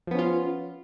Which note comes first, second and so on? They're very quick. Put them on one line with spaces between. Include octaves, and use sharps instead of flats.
F3 B3 C#4 F4